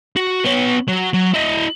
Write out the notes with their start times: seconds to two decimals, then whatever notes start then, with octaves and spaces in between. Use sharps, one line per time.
0.16 F#4
0.45 B3 C#5
0.88 F#3
1.13 F#3
1.34 E4 D#5